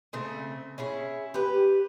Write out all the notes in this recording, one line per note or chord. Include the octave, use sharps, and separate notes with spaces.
C#3 A3 C4
C#4 E4 G#4
G4 B4